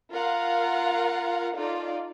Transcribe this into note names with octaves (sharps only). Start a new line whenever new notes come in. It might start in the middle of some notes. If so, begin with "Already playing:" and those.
F4 A#4 F5 F#5
D#4 F4 A4 D5